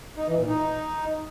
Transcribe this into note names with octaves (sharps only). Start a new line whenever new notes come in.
D#4
E3
A#2
D#4